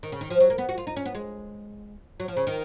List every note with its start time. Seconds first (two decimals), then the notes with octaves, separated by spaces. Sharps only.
0.03 D#3
0.12 C#3
0.21 D#3
0.30 F3
0.40 F#3
0.50 A#3
0.58 B3
0.69 F#4
0.78 F4
0.87 D#4
0.96 C#4
1.05 B3
1.15 G#3
2.20 F#3
2.28 F3
2.37 C#3
2.47 D#3